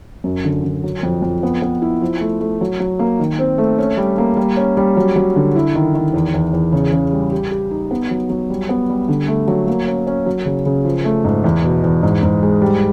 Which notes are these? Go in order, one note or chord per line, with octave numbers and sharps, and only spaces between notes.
F#2
D3
D3
F#3
F2
F2
B3
B3
E4
F3
A3
A3
F#3
F#3
A#3
D#3
C4
A3
C#4
G3
A#3
G3
C#4
G3
F#3
F#3
D3
E4
D#3
D#3
E2
E2
E2
C#3
C#3
G3
G4
G4
D#4
B3
F#3
F#3
G3
B3
G3
D3
A3
F#3
A#3
C#4
C#4
F#3
C#3
C#3
F3
A3
G#2
E2
B2
E2
G#2
G#2
G#3
G3